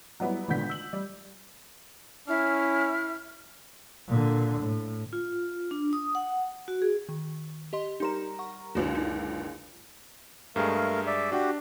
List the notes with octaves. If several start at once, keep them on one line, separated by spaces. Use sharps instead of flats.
F#3 G3 B3 E4
G#1 A#2 D3 B3 G6 B6
E6 F#7
G3
C#4 E4 F6
A#2 D3
A2
F4
D4
D#6
F#5
F#4
G#4
D#3
G4 D#5 C6
G3 D#4 A#4 C6 E7
F#5 C#6
F#1 C#2 D3 F#4
D#4
G2 G#3 A3 G#4 A#4 F5
D5 E5
D4 F#4 G4